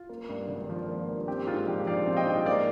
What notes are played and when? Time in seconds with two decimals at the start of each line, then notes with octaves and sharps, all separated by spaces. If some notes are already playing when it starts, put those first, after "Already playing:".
Already playing: F4
0.09 A#3
0.29 G2
0.48 G#1
0.69 F3
0.89 A#3
1.08 G2
1.28 C4 G4
1.47 G#2 F4
1.67 A#1 G4
1.87 F3 D5 F5
2.06 C4
2.17 D#5 G5
2.26 G#2
2.46 A#3 D5 F5